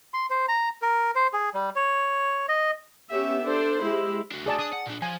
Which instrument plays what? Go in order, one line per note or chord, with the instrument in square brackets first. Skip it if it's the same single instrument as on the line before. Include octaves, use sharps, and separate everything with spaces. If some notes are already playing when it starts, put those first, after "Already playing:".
[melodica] C6
C5
A#5
A#4
C5
G#4
G3
C#5
D#5
[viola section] B3 C#4 G4 E5
D4 A4 C5
G#3 E4 G4
[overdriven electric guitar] D4 F#4
[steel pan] G#4 D5 A5
[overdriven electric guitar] D4 [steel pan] D#6
[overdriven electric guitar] F#5
A#2 D4
[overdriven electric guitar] F3 [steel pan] G#5